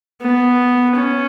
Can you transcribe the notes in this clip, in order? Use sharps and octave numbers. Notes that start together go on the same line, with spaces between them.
B3
C#4